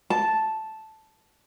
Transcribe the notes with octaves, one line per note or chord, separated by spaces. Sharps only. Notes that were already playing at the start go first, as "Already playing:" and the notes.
A5